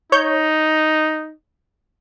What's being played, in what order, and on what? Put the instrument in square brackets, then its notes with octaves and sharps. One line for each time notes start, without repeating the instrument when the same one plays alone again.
[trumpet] D#4 [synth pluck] C#5 G6